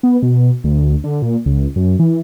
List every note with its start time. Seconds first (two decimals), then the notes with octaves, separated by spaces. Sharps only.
0.03 B3
0.23 B2
0.64 D2
1.04 D3
1.22 A#2
1.46 C#2
1.76 F#2
1.99 E3